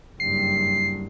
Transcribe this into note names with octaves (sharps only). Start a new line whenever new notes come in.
F#1 G2 C7